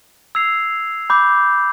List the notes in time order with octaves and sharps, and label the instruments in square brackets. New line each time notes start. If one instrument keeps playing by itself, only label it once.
[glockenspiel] E6 G#6 C7 F7
B5 D6 G6